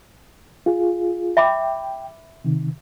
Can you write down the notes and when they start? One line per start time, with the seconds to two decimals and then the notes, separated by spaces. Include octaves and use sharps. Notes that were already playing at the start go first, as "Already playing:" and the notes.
0.66 F4 G#4
1.37 E5 G5 B5 D6
2.45 C3 D#3